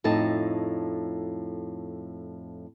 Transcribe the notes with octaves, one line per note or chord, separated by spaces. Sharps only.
F2 A2 D#4 A5